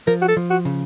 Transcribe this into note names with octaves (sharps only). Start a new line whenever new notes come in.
F3 A#4
F#4
A4
F3
F#4
C#3